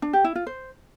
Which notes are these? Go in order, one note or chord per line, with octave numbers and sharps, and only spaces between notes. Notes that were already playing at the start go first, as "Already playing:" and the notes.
D4
G4
E4
F4
C5